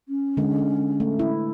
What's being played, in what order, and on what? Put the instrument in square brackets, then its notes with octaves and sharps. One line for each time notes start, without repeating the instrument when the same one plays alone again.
[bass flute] C#4
[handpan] D3 G#3
A3
E4